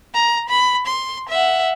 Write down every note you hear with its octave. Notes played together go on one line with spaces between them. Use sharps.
A#5
B5
C6
E5 F#5